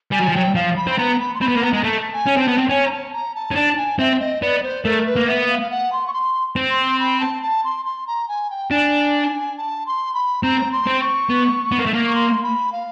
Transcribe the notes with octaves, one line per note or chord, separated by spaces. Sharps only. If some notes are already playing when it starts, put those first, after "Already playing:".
G3 G#5
F#3
F3
F#3 G5
F3 F5
B5
C4 B5
B3 A#5
B5
C6
C4 B5
B3
A#3
B3 A#5
G#3 A#5
A3 A5
G#5
C#4
C4 A5
B3
C4
G5
C#4 G#5
A#5
A5
A#5
A5
C#4
D4 A5
G#5
C4 E5
D#5
B3 D5
C5
A3 A#4
B4
A#3
B3 E5
F5
F5
F#5
C6
C#6
C6
C4
C6
B5
A5
A5
C6
C6
A#5
G#5
G5
D4 G#5
A5
C6
B5
C4 A#5
C6
C4
C#6
B3
B3
A#3
A3
A#3
C#6
C6
B5
F5